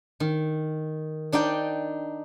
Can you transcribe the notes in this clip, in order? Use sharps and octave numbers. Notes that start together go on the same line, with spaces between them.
D#3
D4 D#4 D5 G5